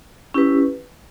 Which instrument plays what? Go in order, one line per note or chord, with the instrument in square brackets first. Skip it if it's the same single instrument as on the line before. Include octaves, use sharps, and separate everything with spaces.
[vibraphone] C#4 E4 G4 B4